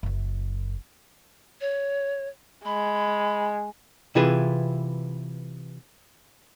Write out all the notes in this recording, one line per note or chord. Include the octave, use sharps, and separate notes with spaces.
F#1 F#2
C#5
G#3 B5
C3 E3 E4 F4 G#4 B4